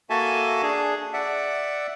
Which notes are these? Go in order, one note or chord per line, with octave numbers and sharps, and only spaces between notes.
A#3 F#4 A4 E5 G#5 A5
D4 G#4
D5 E5 F#5